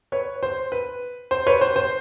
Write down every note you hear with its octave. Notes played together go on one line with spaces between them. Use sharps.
B4 C#5
C5
B4
C5
B4 C#5
C5
C5